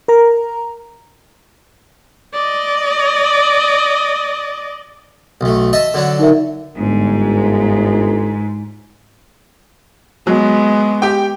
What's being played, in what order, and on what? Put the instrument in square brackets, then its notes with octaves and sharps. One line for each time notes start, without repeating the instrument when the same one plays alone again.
[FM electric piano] A#4 A#5
[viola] D5 D#5
[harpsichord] B1 A3
D#5 E5 A5
D3 F#3 D4
[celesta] D#4 A#4 E5
[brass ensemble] G1 [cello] G#2
[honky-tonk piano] F#3 [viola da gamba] G#3 B3
[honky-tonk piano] G4 G5